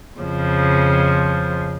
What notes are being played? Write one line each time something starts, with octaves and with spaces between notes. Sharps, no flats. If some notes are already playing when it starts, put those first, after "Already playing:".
F2 C#3 F3